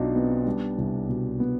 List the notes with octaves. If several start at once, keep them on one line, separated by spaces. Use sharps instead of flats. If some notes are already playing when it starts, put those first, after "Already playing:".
Already playing: B1 B2 D4 D#4 F4
B3 C4
G3 D4
C2
B2
B3